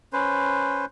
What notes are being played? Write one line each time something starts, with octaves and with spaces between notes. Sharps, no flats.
C#4 B4 C5